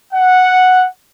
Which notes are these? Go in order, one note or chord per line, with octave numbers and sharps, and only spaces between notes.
F#5